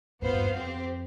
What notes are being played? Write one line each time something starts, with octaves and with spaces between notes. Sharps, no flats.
F2 A2 B3 F4 C5 F5
E2 G2
F2
C4 G4 C5